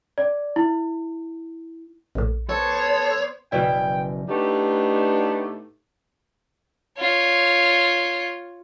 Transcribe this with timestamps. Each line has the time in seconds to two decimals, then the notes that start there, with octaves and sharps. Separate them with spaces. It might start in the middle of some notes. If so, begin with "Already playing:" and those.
0.18 D5
0.56 E4
2.15 A#1 A2
2.49 B3 A4 C5 C#5
3.52 F#1 B2 E3 E4 B4 D5 G5
4.28 A2 A3 B3 D4 D#4 G4
6.99 F4 C#5